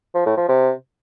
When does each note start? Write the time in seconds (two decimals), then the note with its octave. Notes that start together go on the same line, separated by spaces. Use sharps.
0.15 F3
0.26 A2
0.37 F3
0.48 C3